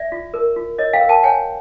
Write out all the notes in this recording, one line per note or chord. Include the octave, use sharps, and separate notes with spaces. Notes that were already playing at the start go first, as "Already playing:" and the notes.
Already playing: D5 E5
F4
A#4
F4
A#4 C#5 D#5
F5 G5
A#4
G5 A5
C#5 F#5 G#5